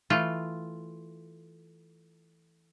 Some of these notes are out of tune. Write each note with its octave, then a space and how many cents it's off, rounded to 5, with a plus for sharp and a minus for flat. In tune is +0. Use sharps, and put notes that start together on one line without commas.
E3 +0 A3 +0 F4 +0